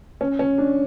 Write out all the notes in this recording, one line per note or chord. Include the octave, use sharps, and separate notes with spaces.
C#4
C#4
D4